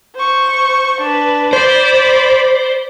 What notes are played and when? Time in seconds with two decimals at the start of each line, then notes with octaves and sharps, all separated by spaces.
0.15 C5 C#6
1.01 D4 B4
1.53 C5 D5 B5